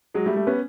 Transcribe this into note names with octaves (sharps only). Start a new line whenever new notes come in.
F#3 G#3
G3 A3
G3 A3
B3 C#4